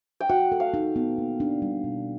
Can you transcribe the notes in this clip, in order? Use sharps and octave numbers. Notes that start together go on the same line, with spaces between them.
G5
F#4 F#5
A4
F5
D#4
B3
A#3
D4
G3
B2